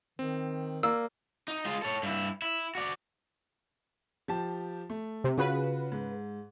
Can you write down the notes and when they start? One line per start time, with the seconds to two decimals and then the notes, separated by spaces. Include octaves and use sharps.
0.19 D#3 C4
0.83 A#3 D5 E6
1.48 D#4
1.65 G#3 F4
1.82 A4 C#5
2.03 G2 E4
2.42 E4
2.75 F#4 D5
4.28 F3 G4 A5
4.90 A3
5.24 C3
5.38 C#3 F4 F#4 B4
5.92 G#2